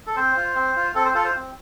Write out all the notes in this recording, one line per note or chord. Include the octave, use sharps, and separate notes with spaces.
A4
C4 C5
F4
C4
F4
C4 A4
C5
F4 A4
C5
C4